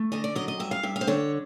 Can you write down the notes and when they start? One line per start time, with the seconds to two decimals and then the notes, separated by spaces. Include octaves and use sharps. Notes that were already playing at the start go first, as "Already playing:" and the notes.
Already playing: A3
0.12 D3 D#5
0.24 D5
0.36 F#3 D#5
0.48 D#5
0.59 G2 E5
0.71 F5
0.83 G2 E5
0.96 F5
1.01 C5
1.07 D3 C#5